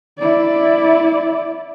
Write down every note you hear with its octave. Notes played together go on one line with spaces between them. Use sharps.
E4 D5